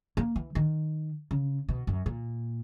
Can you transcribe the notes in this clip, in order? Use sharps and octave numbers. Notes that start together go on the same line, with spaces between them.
A#3
E3
D#3
C#3
B2
F#2
A#2